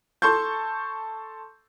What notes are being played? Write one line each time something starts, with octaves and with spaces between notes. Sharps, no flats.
A4 A5 C6 C#6 G6